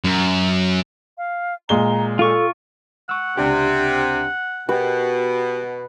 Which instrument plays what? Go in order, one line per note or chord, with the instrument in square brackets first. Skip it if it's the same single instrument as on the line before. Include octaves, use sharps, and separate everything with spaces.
[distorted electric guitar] F#2
[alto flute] F5
[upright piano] A#2 G#3 G7 [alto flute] A#5
[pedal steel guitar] F4 C#6 [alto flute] A4
[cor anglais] F#5 [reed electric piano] C#6 E6
[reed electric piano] C#2 D4 G4 [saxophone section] C3
[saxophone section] B2 [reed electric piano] F#4 G4 G5 [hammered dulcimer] B4